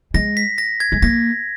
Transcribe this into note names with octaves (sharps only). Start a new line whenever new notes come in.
G#3 A#6
B6
A#6
G#6
G#3
A#3 A#6